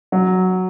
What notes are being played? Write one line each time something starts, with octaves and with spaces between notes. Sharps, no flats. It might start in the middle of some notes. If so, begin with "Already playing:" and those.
F#3